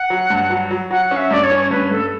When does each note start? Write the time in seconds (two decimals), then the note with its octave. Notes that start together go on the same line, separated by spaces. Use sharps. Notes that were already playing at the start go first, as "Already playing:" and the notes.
Already playing: F#5
0.10 F#3
0.30 G2
0.50 F#3
0.71 F#3
0.91 F#3 F#5
1.06 F#5
1.11 C#4
1.17 E5
1.31 G2 D5
1.44 C#5
1.51 C#4
1.59 C#5
1.71 G2 B4
1.91 G2 A4